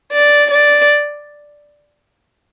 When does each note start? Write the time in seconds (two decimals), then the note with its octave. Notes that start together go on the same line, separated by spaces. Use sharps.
0.12 D5
0.51 D5